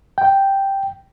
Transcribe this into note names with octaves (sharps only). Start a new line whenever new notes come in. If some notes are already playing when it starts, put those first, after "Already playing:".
G5